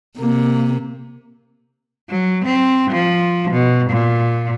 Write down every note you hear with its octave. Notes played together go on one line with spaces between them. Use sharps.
C3 A#3
F#3
C4
F3
B2
A#2